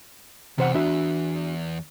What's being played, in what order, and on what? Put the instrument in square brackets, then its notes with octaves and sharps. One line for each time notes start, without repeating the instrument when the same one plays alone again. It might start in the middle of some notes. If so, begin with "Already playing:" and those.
[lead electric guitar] E2 [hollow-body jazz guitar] C3 C5 F#5
[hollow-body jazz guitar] D4 F#4 E5